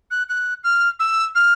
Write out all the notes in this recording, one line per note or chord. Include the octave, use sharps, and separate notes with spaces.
F#6
F#6
F6
E6
F6